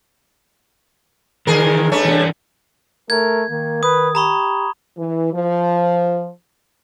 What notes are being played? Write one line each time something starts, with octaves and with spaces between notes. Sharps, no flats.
E2 D#3 E3 G#4 A#4
G2 A3 C#4
E3 D4
A3 A#4 G#6
D#3 A#3
B4 D#6
G4 A#5 B5 C#6
E3
F3